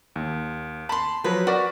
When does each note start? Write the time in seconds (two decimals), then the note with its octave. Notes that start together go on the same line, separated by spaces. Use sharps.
0.16 D#2
0.89 A5 B5 C6
1.24 F3 F#3 B4
1.47 F#4 A#4 B4 D5